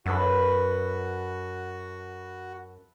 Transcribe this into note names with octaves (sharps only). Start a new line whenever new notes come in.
F#2 F#4 A4 B4 E5